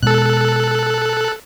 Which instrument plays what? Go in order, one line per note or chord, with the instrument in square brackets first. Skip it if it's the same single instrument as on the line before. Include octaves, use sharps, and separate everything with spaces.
[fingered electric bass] B2 G#3 [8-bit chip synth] A4 F#6